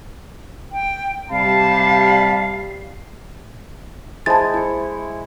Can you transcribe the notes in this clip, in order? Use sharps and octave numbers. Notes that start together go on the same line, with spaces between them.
G5
C3 G3 F5 A5 B5
G#3 E4 C5 A5 A6
E4 C#6